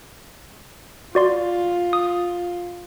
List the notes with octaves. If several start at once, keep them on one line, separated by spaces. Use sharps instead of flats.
F4 F#4 D5 C6
D#6